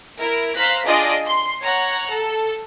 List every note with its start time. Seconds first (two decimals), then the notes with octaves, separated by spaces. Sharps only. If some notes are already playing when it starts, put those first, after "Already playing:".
0.17 E4 A#4
0.55 C5 F5 A#5 F#6 B6
0.86 D4 F4 G#4 D5 D#5
1.26 C6
1.64 C#5 F#5 A#5
2.11 A4